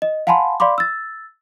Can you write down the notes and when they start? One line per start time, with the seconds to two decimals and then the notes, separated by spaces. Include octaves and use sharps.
0.02 D#5
0.27 F5 F#5 G#5 A5 B5 C6
0.60 D5 F5 B5 C6 D6
0.78 E6 A6